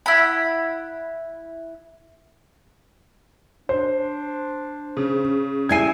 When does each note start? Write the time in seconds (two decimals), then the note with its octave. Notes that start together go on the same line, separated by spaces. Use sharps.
0.06 E4 F#5 B5
3.69 D4 C5
4.97 C#3
5.69 G3 E4 G#5 G#6 C7